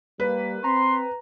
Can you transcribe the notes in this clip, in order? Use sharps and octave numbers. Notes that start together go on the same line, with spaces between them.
G3 A#3 B4
C4 A#5 C6